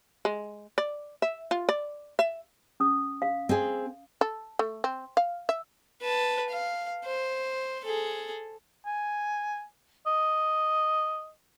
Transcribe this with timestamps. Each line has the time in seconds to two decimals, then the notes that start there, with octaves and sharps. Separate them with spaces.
0.25 G#3
0.78 D5
1.22 E5
1.51 F4
1.69 D5
2.19 E5
2.80 C#4 D#6
3.22 F5
3.49 C4 G#4
4.21 A4
4.59 A3
4.84 C4
5.17 F5
5.49 E5
6.02 B4 A5
6.49 F5
7.05 C5
7.85 G#4 A4
8.86 G#5
10.06 D#5